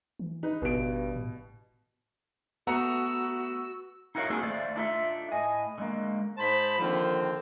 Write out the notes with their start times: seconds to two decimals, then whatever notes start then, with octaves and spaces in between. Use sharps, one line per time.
0.19 E3
0.43 D#4 B4
0.62 G#1 G2 B2 D7
1.16 A2
2.67 A3 B3 F#4 F#5 A#5 E6 C#7
4.15 D#4 E4 F#4 A#4 C#5 F5
4.30 A#3 C4 D4 F#4 G#4 A4
4.43 A3 C5 D5 F5
4.76 D4 D#4 F4 A4 D5 E5
5.32 A2 D#5 G#5
5.78 D3 G#3 A#3
6.38 G#2 C5 A5 B5
6.79 D3 D#3 F3 A#3 C4